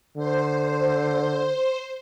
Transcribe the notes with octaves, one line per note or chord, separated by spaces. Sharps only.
D3 C5